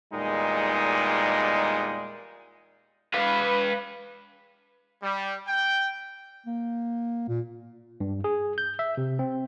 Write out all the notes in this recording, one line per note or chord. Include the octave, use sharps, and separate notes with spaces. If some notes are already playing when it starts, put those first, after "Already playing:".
E2 A#2 G3 G#3 D#4
B4 F5
G3
G5
A#3
A#2
G2
G#4
G6
E5
C3
C4